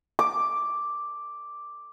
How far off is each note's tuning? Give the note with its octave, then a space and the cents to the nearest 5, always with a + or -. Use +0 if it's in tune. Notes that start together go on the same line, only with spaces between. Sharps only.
D6 +0